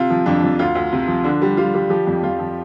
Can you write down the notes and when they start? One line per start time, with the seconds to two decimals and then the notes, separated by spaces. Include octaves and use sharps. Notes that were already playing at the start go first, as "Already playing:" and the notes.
Already playing: C3 F4
0.10 F3
0.26 F2 D4
0.43 F2
0.59 D2 F4
0.75 D2
0.92 C3
1.08 F3
1.24 D3 D4
1.42 G3
1.57 G3 F4
1.75 G3
1.90 F3 G4
2.07 F2
2.23 F2 F4
2.40 F3